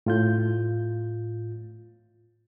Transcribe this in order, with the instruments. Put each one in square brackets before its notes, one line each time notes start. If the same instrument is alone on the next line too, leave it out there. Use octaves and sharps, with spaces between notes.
[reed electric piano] A2 F4 G6